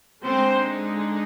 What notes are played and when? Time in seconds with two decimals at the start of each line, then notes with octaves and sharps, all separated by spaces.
0.22 D3 G#3 C4 D#4 C5